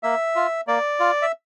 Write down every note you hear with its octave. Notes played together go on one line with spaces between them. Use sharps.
A#3 E5
F4
A#3 D5
F4
E5